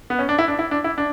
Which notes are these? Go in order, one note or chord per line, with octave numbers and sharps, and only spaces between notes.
B3
C#4
D4
E4
D4
E4
D4
E4
D4